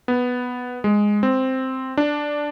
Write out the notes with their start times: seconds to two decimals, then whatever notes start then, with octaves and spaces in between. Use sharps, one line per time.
0.08 B3
0.84 G#3
1.23 C4
1.97 D4